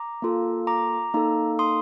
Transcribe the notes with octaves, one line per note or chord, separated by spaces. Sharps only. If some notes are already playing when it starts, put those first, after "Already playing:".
Already playing: A#5 D6
A#3 F4 A4
A#5 D6
A#3 D#4 A4
C6 D#6